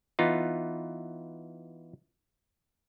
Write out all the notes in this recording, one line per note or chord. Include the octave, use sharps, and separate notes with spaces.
E3 B3 D#4 F4